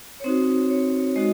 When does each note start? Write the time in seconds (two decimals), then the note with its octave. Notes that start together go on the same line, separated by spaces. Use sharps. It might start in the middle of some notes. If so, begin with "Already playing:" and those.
0.20 C#5
0.24 C4 D#4 F#4 C5
0.70 C#5
1.15 G#3 D#4 F#4 D#5